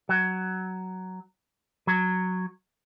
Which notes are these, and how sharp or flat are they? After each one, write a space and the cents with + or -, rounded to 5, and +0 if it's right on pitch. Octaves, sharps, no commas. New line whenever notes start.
F#3 +10
F#3 -5